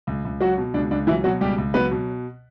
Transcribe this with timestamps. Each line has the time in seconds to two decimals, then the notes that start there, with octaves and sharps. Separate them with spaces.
0.07 C#2
0.25 C#2
0.41 F#3 F#4
0.58 B2
0.74 C#2 D4
0.91 C#2 D4
1.07 E3 F#3 E4
1.24 B2 F#3 F#4
1.41 C#2 G3 G4
1.58 C#2
1.74 F#3 B3 B4
1.91 B2